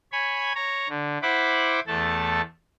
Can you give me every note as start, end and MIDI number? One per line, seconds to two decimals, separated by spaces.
0.12 0.53 73
0.12 0.53 80
0.12 0.53 83
0.55 0.88 73
0.55 0.88 82
0.89 1.18 50
1.22 1.80 64
1.22 1.80 72
1.22 1.80 78
1.22 1.80 83
1.22 1.80 86
1.87 2.41 40
1.87 2.41 57
1.87 2.41 69
1.87 2.41 81